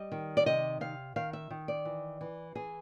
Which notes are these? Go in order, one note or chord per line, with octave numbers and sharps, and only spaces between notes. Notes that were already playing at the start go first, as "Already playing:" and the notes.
Already playing: G3 D#5
D#3
D5
C3 D#5
C3 F5
D#3 F5
E5
D#3
D5
E3
E3
E3 G#4